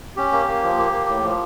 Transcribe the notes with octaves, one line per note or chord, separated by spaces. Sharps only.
C#4 G4
A#3
A#3
F3
A#3
A#3
A2
F3